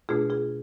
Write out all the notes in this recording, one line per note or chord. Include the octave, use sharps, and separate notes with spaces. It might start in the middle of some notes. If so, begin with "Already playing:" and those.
B2 A3 D4 F4 G#4
F4 G#4